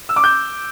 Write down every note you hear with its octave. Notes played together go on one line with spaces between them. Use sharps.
E6
D6
G6